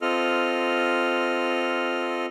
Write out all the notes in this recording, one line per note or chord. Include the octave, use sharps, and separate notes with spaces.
C4 F4 A4 D#5 F6